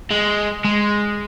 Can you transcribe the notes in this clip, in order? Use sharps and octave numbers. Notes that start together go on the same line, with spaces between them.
G#3
G#3